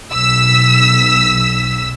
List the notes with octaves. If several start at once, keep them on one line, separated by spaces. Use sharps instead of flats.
B1 E6 B6